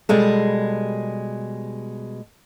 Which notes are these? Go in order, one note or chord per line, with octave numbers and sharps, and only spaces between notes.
B2 G3 G#3 A4